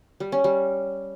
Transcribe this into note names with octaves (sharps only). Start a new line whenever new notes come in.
G3
C#4
G3